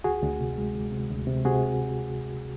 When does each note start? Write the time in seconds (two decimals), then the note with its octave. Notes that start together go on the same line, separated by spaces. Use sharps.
0.04 D2 F#4 G#4
0.23 D2
0.39 C3
0.58 G#3
0.74 D2
0.92 C3
1.10 D2
1.27 C3
1.45 C3 F#4 G#4